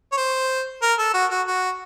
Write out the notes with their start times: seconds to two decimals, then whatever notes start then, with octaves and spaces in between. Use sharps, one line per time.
0.12 C#5
0.17 C5
0.82 A#4
0.98 A4
1.14 F#4
1.31 F#4
1.47 F#4